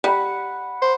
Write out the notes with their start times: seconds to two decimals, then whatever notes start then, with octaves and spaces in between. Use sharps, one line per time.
0.04 G3 F#5 B5
0.82 C5